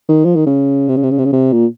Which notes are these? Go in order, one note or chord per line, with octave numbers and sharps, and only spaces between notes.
D#3
F3
D#3
C#3
C3
C#3
C3
C#3
C3
C#3
C3
A#2